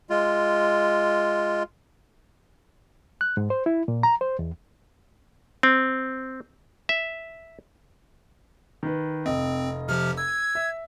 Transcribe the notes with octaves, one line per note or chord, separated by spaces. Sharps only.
G#3 F4
F#6
G#2
C5
E4
A#2
A#5
C5
E2
C4
E5
D#3 B4
F1 C4 D#5
C3 F3 G4 F6
E6 G#6
E5